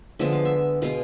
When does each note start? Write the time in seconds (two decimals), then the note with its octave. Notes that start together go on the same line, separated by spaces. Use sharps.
0.19 D3 F3 G#3 B3 E5
0.33 F5
0.45 E5
0.82 B2 G#3 B3 F5